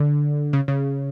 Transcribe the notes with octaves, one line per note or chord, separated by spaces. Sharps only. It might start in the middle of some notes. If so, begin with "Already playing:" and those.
Already playing: D3
C#3
C#3